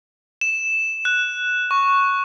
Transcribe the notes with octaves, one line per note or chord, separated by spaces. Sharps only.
E7
F#6
C#6